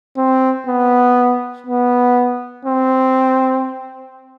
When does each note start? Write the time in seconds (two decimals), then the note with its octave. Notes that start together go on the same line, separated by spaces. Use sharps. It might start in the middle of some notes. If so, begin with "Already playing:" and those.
0.17 C4
0.67 B3
1.67 B3
2.65 C4